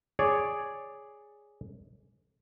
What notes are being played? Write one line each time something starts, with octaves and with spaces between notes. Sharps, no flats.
G#4 C#5 D5